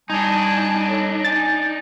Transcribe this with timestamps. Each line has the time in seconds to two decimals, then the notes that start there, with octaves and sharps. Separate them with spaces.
0.10 G3 D4 D#4 G#5 A5 G#6
0.88 A4 C#5
1.25 G#5 A6